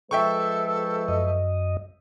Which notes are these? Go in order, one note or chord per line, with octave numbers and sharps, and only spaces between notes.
F3 G#3 A4 B4 E5 G5 C#6
F#2 D#5